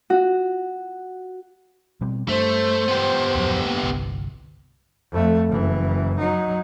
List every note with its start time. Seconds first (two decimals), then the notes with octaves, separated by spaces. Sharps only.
0.10 F#4
2.01 B2 G3 C4
2.28 G2 A3 C5
2.88 B3 G4
3.35 D1 F2 F#3
3.66 A#3
3.83 G1 C2
5.12 F2 A3
5.49 F#1 E3
6.19 F#3 D#4